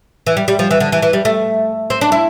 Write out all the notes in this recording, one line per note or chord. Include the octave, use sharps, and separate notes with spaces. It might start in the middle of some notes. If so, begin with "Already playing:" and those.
E3
G3
G3
F3
E3
D3
E3
E3
G3
A3
C4
D4
E4